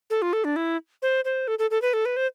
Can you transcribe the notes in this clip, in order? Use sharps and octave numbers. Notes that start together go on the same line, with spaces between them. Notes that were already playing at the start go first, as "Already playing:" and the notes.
A4
F4
A4
D4
E4
C5
C5
A4
A4
A4
B4
A4
B4
C5